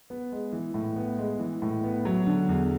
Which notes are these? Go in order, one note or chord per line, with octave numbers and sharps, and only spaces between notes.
B3
G#3
E3
A2
B3
G#3
E3
A2
B3
F#3
D3
E2